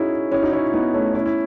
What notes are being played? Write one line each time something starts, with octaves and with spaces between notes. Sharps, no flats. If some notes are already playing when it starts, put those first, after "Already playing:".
Already playing: C#4 D#4 E4 F#4 G#4
C#4 E4
D#4 F#4
C#4 E4
E4
B3 D#4
A3 C#4
C#4 E4
E4